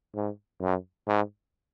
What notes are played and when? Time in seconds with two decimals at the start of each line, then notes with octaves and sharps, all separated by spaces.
0.15 G#2
0.61 F#2
1.07 G#2